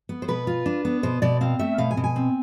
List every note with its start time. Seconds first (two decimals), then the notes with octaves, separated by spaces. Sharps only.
0.09 B3
0.22 C5
0.28 B2 B4
0.47 F4
0.66 D4
0.85 B3
1.03 B2 C5
1.22 B2 D5
1.41 C4 F5
1.59 A3 E5
1.78 B2 F5
1.91 G#5
1.97 B2
2.04 G#5
2.16 C4